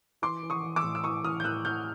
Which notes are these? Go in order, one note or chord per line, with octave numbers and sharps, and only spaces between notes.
E3 C6 D6
E3
C#6 D#6
E3
D6 E6
A2
E6
E3 C#6 D#6
A2 D#6 F6
G6
A2 E6 F#6
A2 F6 G6